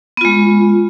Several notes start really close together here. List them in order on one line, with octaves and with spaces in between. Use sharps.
B3 F4 G#3